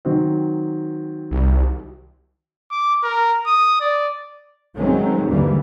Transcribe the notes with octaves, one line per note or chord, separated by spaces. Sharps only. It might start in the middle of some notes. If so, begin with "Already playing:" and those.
D#3 F#3 C4
C2
D6
A#4
D#6
D5
D#3 F#3 G#3 A3 C4 C#4
D#2 G#2 D3 E3 G3 A#3